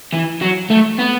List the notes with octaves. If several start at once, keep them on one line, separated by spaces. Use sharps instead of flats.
E3
F#3
A3
B3